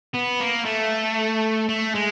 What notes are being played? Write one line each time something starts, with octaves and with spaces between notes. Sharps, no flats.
B3
A#3
A3
A3
G#3